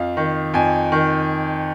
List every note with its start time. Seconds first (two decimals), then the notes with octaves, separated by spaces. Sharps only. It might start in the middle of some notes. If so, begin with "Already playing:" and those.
Already playing: F2 F5
0.17 D#3
0.54 F2 G#5
0.92 D#3